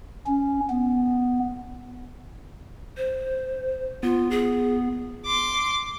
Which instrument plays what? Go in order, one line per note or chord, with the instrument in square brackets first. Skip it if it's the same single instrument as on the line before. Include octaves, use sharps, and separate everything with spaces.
[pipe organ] C#4
B3
[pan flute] C5
[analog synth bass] B3 [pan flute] F4
[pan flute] G#4
[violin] C6 D6